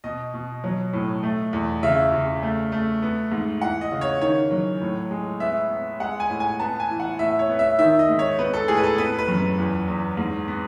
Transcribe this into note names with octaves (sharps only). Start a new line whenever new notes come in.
B2 D#5
B2
F#3
A2
A3
E2
C#3 E5
C#3
A3
A3
B3
G#2
E3 F#5
D#5
C#3
C#5
D#3 C#5
F#3
A2
G#3
B3 E5
B3
G#3 F#5
G#5
A2
G#5
B3 A5
G#5
E3
F#5
A2 E5
C#5
B3
E5
D#3 E5
D#5
G#2
C#5
B3 B4
A4
A2 G#4
B4
A4
B3 B4
B4
F#2
B4
E2
E2
G#2
B3